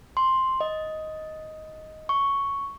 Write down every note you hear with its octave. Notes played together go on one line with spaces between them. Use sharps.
C6
D#5
C#6